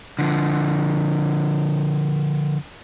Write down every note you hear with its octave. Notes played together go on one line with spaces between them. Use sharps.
D3 F3